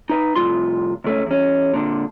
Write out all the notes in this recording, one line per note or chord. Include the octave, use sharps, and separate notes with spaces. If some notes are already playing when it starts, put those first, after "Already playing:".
D#4 B4
C2 F2 A2 C#3 F4 C6
C#2 A3 C#4
E2 C#4
A#2 D3